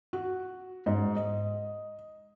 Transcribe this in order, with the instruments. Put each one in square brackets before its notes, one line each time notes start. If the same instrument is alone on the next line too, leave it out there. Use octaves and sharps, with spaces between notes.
[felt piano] F#4
G#2
D#5